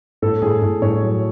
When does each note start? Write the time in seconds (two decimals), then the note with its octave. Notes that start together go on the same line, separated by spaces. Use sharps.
0.22 A2 A4
0.42 A2 G#4
0.62 A2
0.82 A2 C#5
1.03 F#3